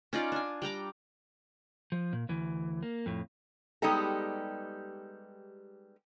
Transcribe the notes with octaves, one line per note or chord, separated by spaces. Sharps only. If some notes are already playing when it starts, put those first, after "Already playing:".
C#4 D#4 F4 D5
D4 G#5
G3 G5 A#5 D6
F3
A#2
D2 E3
A#3
F2 A2
G3 G#3 B3 D#4 G4 A4